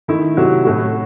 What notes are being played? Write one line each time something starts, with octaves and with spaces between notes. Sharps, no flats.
D#3 A3 E4
C3 F#3 A3
A2 F#3 A3 F#4